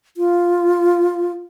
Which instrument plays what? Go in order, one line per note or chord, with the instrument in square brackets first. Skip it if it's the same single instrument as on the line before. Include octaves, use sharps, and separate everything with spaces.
[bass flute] F4